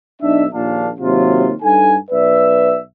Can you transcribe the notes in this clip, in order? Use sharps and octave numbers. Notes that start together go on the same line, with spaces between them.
B1 D4 D#4 E5
A#1 D#2 A#2 D4 F5 A5
D#2 C3 F#3 F4
G2 D#4 A4 G#5
B1 B4 D5 E5